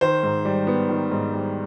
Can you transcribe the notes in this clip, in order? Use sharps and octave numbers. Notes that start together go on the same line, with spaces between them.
D#3 C5
G#2
G3
B3
D#3
G#2
G3